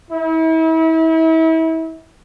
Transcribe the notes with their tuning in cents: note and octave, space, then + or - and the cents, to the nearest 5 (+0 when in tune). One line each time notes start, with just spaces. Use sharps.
E4 -35